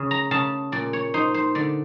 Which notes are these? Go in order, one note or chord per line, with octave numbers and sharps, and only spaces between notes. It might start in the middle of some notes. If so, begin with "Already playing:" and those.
Already playing: C#3
A#5
C#3 A5
A#2 D5
C#5
D#4 C5
C5
D3 D5